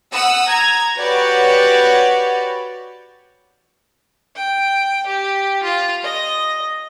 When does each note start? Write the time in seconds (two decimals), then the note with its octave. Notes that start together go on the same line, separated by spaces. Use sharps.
0.13 F#5 D#6 E6
0.50 A#5 G#6
0.99 F#4 G4 B4 C#5 D5 F#5
4.35 G5
5.06 G4
5.63 F4
6.03 D#5